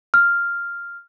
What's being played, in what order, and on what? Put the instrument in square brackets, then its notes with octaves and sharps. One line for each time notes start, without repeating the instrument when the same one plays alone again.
[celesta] F6